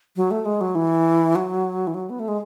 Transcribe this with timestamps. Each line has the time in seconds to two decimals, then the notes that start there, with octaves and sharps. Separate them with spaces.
0.16 F#3
0.31 A3
0.45 G#3
0.61 F#3
0.75 E3
1.35 F#3
1.87 E3
1.94 F#3
2.10 B3
2.20 A3
2.28 G#3